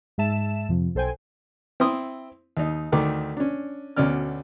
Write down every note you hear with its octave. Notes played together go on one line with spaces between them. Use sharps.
G#2 G#3 E5 A5 E7
F2 C3 F3
B1 A4 C5 G5 G#5
C4 E4 C6 D#6
D#2 D#4
D2 D#3 A3 D6
C#4 D4
D2 B2 C#4 D5 F6